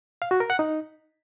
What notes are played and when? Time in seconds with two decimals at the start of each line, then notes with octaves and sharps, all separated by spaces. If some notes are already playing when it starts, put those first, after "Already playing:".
0.22 F5
0.31 F#4
0.40 A#4
0.50 F#5
0.59 D#4